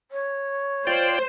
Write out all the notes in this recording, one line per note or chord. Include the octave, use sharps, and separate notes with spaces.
C#5
F4 C5 D5 G5